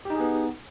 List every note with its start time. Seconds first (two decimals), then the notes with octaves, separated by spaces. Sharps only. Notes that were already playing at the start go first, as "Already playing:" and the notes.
0.05 G4
0.10 D#4
0.15 G#4
0.20 B3